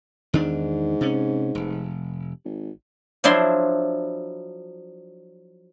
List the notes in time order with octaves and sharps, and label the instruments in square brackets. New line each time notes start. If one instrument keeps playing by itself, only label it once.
[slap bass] E2 D#3 D4 [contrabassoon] G#2
[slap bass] C3 C#4
F1
[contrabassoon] G#1
[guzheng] F3 F#3 D4 E4 C6